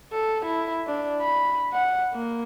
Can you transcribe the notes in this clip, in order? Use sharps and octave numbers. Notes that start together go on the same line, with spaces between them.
A4
E4
D4
B5
F#5
A#3